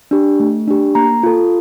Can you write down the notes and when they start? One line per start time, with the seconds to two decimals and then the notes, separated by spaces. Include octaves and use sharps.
0.11 D4 G4
0.40 A3
0.68 D4 G4
0.95 A#3 A#5
1.23 F4 A4